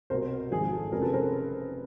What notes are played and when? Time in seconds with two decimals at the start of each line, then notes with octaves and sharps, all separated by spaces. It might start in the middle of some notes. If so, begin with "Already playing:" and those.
0.10 C2 B2 A#4 C5
0.51 G#1 G#2 F3 G#4
0.64 G#4
0.72 A4
0.92 F1 F2 C#3 G#4 A#4
1.02 A4 B4
1.13 A#4 C5